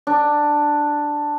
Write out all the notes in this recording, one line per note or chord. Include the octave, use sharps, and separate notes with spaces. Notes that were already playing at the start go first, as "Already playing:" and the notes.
D4